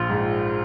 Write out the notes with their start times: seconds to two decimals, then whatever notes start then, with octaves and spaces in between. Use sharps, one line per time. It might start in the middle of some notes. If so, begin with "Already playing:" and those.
Already playing: A#1 F3 F4
0.09 G#2